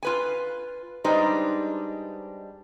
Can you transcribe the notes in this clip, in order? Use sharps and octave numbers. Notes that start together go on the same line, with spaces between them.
F4 B4 G#5
G3 G#3 D4 D#4 B4 C5